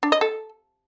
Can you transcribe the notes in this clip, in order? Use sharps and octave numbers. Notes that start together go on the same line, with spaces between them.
D4
D#5
A4